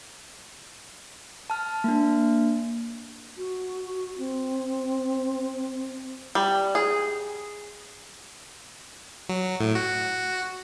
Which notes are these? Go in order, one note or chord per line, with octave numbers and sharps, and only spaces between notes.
A5 F6
A#3 D4
F#4
C4
G3
G#4
F#3
A2
F#4